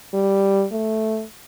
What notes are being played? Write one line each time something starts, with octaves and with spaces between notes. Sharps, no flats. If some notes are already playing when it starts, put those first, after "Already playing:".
G3
A3